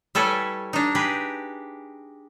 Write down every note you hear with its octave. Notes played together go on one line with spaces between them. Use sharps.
G3 E4 A4 B4 C#5 G#5
D4 D#4
G4 G#4 B4